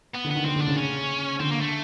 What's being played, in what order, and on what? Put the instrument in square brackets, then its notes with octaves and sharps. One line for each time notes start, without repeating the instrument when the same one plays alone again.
[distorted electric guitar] B3
[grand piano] D3
[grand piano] D#3 [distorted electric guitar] B3
[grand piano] D3 [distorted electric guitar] C4
[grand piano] D3
[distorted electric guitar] D4
[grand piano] C#3
[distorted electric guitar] C#4
[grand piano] D3 [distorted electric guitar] C4
[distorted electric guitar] A#3
A3